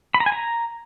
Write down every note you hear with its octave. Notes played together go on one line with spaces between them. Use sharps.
B5
A#5
G#5
A#5